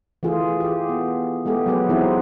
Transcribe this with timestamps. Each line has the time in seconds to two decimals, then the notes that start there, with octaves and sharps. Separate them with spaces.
0.23 E3 A3 F4 G#4
0.60 G4 G#4
0.89 B3
1.45 G#3 A3 B3 G4 G#4
1.66 F#3 G#3 B3 G4 G#4 B4
1.89 E3 B3 C4 D#4 E4 F#4